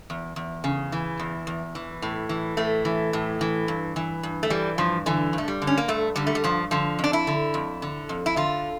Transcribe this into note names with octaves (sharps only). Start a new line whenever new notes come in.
E2
E2
C#3
E3
E2
E2
E3
A2
E3
A2 A3
E3
A2
E3
G2
E3
G2
A3
E3 G3
G2 F3
D3 E3
G2 A3
G3
D3
C#4
A#3
G2 A3
D3 G3
A3
G3
G2 F3
D3 F3
F2
D4
E4
D3
F2
D3
F2
E4
D3 F4